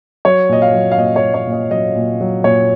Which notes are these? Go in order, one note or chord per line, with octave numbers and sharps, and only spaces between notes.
F#3 C#5
A#2 D#5
F5
F#3
F5
A#2 D#5
C#5
F#3
C#5
A#2
D#5
F#3 D#5
A#2
F#3
A#2 C#5